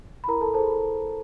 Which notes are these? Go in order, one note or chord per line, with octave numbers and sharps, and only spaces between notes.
B5
E4 A#4 A#5
A4 A5
G#4 A4 C5 A5